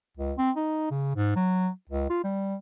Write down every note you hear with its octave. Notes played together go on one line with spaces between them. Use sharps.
C#2
C4
D#4
C#3
G#2
F#3
C#2
F4
G3